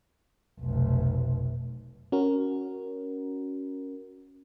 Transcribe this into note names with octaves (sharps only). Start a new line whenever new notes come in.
F1 B1
C#4 F#4 A#4